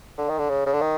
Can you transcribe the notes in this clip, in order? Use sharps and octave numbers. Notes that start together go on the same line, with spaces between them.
D3
D#3
D3
C#3
C#3
D3
D#3